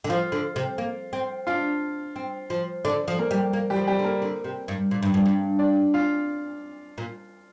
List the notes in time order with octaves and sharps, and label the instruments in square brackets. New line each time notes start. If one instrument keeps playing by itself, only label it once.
[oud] D3
[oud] F3 [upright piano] F4 F5
[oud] D3
C3
A#3
C4
[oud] D4 [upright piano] F4 F5
[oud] C4
F3
[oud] D3 [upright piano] D4 D5
[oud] F3
[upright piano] A#3 A#4
[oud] G3
A#3
[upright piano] G3 G4
[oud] F3
[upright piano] G3 G4
[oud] D3
[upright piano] A#3 A#4
[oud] D3
C3
G2
A#2
G2
F2
G2
[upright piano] D4 D5
F4 F5
[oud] A#2